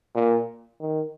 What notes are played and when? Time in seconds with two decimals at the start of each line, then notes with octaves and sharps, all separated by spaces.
0.15 A#2
0.81 D#3